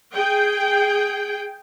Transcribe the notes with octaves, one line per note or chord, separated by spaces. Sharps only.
G#4 G5